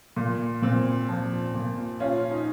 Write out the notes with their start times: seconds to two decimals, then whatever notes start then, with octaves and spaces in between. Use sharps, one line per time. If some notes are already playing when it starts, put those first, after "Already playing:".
0.16 A#2
0.62 A#2 C4
1.09 F3
1.55 A#2
2.00 C#4 F4
2.31 D#4